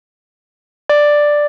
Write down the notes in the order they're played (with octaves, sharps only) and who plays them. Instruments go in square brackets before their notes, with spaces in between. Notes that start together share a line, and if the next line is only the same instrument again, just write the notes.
[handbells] D5